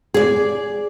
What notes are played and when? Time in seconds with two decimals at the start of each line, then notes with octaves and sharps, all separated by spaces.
0.14 G#4 D5